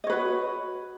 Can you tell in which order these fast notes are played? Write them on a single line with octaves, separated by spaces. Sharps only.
D#5 C#5 B4 F#4